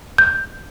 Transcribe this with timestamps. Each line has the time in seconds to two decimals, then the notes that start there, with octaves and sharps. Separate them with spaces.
0.18 G6